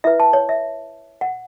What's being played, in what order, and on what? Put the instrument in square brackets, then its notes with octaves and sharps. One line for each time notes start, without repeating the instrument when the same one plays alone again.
[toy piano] E4 B4 E5
A5
C#5
E5
F#5